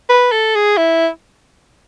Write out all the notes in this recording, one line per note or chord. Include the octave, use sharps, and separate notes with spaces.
B4
A4
G#4
E4